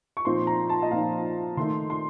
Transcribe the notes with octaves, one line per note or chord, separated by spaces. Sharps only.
C#6
A#2 F3 C4 D#4 C6
A#5
A5
D#5
A#2 F3 C4 D#4 F5
D#3 A3 D#4 C6
C6